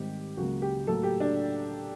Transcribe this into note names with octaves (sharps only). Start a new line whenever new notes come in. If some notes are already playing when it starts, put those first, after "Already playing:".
Already playing: G#2 D#3 G3 C4 G4
C#2 C#3 F#3 A#3 F#4
G4
A2 F#3 A#3 A4
G4
D4